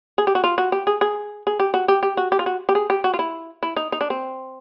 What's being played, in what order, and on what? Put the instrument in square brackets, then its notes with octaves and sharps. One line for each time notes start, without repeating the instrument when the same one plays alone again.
[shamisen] G#4
G4
F#4
F4
F#4
G4
G#4
G#4
G#4
G4
F#4
G4
G4
F#4
G4
F4
F#4
G4
G#4
G4
F#4
F4
E4
E4
D#4
D#4
D4
C4